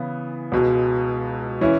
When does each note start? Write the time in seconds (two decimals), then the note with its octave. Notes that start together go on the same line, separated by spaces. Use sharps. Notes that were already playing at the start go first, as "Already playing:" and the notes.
Already playing: C#3 E3 B3
0.52 C#2 B2 G#3
1.61 E3 C#4 E4